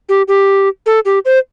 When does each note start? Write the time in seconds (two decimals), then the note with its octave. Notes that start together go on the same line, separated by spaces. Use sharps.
0.09 G4
0.28 G4
0.86 A4
1.05 G4
1.25 C5